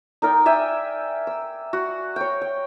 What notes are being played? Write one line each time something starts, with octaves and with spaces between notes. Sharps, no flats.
D#4 A#4 D5 G5
D5 E5 G5 G#5
E6
F#4
C#5 G5
G5